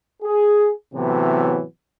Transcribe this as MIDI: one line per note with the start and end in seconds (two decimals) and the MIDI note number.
0.23 0.70 68
0.93 1.61 45
0.93 1.61 48
0.93 1.61 52
0.93 1.61 54
0.93 1.61 59